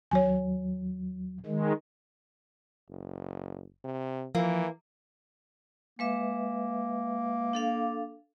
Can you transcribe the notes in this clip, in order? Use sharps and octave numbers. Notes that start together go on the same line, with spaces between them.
D#2 F#3 C#5 G#5
D#3 G#3
F#1
C3
E3 F3 A#3
G#3 A#3 B4 E5
D4 A4 F5